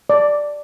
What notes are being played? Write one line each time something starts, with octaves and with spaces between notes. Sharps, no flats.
D5